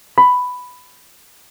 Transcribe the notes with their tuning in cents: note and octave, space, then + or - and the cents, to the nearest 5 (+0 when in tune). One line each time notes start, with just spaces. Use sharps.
B5 +10